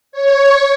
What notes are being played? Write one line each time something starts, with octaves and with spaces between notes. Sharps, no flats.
C#5